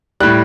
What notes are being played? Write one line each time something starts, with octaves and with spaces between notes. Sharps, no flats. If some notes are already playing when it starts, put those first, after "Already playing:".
A2 G3 F#6